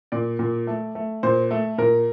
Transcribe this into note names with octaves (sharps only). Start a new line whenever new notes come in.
A#2 D5
A#2
A3
A3
A#2 C5
A3 A4
A#2 A#4